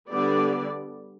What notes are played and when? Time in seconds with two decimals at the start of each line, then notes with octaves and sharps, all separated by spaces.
0.11 D3 G3 B3 D5